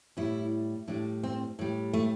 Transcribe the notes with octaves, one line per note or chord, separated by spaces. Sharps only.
A2 G3 E4
A2 G3 D4
C4
A2 G3
A3